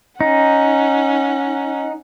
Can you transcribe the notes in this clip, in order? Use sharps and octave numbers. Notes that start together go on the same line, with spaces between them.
C#4 D#4 F#5